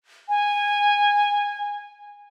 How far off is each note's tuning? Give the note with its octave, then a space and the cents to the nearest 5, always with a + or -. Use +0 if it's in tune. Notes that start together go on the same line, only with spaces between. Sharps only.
G#5 -15